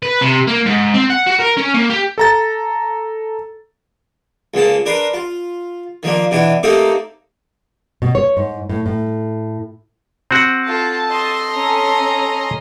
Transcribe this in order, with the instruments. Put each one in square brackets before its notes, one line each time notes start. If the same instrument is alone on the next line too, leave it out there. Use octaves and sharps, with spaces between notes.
[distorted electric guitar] B4
C3
A#3
G#2
C4
F#5
F#4
A#4
C#4
A#3
G4
[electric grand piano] A4 A#5 A6
[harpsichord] C#2 C#3 A#3 A5
D4 A#4 B4 C6
F4
D#3 F3 A#3 D4
B2 E3 D4 E4
A3 A#3 C4 D#4 G4 A4
[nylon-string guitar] B2
C#5
G#2
A2
A2
[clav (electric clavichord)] C4 F#4 F#5
[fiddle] F4 [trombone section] A4 [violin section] A5
[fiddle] D#5 C6
[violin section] C#4 A#5